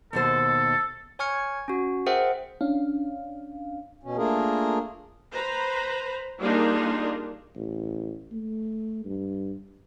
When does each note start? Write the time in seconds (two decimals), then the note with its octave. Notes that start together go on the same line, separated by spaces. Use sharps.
0.13 D#2 B2 A4 C5
1.19 C#5 G#5 C#6 F6 G#6 C#7
1.68 C#4 F#4
2.06 G#4 A#4 C5 E5 F#5 G5
2.61 C#4 D4 F5
4.03 B2 C#4
4.17 A3 A#3 D4 F4 G#4 A#4
5.32 B4 C5 A#5 B5
6.40 G3 A#3 D4 D#4 F4 G#4
7.55 A1
8.32 A3
9.05 G2